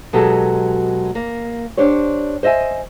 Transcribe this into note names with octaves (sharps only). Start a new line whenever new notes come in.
B2 F#3 G#3 G4 A4
A#3
D4 G4 C5 C#5
C5 D#5 E5 G5 G#5